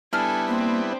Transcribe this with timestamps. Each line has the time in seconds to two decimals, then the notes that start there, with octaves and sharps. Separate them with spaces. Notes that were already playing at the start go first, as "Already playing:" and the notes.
0.13 G3 B3 D4 E4 A4 G#5 F6
0.48 A#3 C4 C5